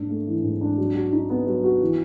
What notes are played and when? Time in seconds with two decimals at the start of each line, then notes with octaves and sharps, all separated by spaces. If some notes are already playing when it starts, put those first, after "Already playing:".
Already playing: G#2 A#3 D4
0.09 A3
0.27 E3
0.43 G#2
0.61 D4
0.78 F#3
0.95 F#4
1.12 D#4
1.30 B3
1.46 F#3
1.64 F#4
1.81 E3